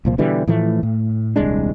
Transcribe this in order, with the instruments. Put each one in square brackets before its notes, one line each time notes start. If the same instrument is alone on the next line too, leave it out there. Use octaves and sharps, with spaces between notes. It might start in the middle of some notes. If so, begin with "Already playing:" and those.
[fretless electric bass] C2 A#2 F3
B2 D3 E3 G3
A2 E3 F3 A3
A2
D#1 C2 G#3 D4